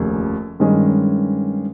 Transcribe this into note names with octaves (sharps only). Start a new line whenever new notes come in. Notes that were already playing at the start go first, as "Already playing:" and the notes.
Already playing: F1 D#2 C#3
G2 D#3 G#3 C#4